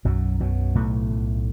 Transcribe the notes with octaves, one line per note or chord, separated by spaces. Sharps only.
B1 F#2 F#3
F#2 B2 F#3
B1 A2 A3
B1